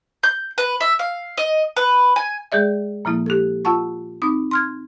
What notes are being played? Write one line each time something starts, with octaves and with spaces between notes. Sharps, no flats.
G6
B4
E5
F5
D#5
B4
G#5
G#3 G#4 D5 E5
A#2 F3 A#3 E4
G4 A4
F4 F#5 A5 C#6
C4 D#4 D#6
C6 F6 G#6